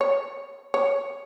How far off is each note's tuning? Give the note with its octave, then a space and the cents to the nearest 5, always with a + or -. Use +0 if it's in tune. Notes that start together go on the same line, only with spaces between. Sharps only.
C#5 -5
C#5 +10